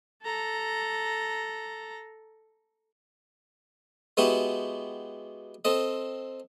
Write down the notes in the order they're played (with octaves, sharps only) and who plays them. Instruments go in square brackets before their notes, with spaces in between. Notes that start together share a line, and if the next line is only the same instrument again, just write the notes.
[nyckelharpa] A4 A#5
[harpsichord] G#3 B3 E4 F#4 G4
C4 A4 D#5